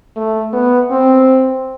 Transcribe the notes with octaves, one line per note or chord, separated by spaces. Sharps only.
A3
B3
C4